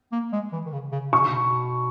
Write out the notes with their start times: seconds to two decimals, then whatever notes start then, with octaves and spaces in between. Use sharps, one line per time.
0.12 A#3
0.33 G#3
0.52 E3
0.66 D#3
0.72 C#3
0.92 C#3
1.12 B2 C#6
1.19 C#3
1.27 B2